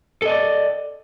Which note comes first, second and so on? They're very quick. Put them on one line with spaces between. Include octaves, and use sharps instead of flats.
A4 D#5 D5